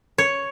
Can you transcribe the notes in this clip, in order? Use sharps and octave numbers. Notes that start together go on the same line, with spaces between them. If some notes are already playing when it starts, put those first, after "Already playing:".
C#5